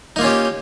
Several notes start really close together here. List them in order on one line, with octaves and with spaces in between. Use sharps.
D#4 A#3 F4 C#4 G4